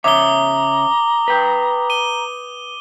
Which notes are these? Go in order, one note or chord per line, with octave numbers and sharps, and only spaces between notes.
C#3 C#5 E5 A#5 D6 D#6 G7
B4 G5
D#7 G7